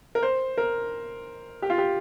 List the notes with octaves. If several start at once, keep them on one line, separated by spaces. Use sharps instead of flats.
A#4
C5
A#4
G4
F4
G4